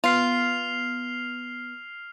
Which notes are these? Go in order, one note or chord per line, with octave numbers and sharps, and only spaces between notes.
B3 F4 F6 C7 F7